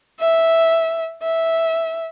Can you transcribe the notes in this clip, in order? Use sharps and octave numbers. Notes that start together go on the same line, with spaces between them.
E5
E5